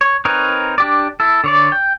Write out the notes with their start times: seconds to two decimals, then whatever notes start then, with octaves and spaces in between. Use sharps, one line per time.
0.01 C#5
0.25 C4 D#4 A#4 B4 C#5
0.78 D4 G4 D5
1.20 E4 A4
1.44 D3 C#5 D5
1.72 G5